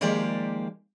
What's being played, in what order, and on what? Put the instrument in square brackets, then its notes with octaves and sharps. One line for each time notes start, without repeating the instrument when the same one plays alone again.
[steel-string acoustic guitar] D#3 F3 G#3 A#3 G4 D5